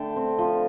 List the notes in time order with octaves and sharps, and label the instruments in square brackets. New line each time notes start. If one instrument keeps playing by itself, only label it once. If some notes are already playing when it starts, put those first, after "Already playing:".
Already playing: [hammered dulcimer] D3 A3 G5 A5 B5
C4
F3